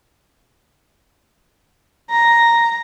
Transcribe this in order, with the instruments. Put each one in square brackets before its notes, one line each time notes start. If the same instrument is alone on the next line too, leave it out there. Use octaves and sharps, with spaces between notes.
[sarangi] A#5